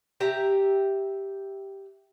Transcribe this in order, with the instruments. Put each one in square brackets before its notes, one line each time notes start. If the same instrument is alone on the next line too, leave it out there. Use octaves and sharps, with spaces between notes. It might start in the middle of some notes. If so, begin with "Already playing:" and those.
[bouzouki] G4 E5 A#5